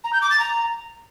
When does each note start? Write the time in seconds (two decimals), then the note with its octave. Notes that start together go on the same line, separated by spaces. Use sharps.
0.04 A#5
0.13 G6
0.22 D6
0.31 A6
0.40 A#5